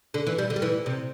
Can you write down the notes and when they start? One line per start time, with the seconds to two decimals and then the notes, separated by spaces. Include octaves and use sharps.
0.14 D3
0.27 E3
0.38 G3
0.50 D3
0.56 G3
0.62 E3
0.86 C3